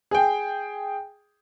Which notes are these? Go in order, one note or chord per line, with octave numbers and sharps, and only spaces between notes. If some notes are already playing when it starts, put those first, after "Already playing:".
G#4 G5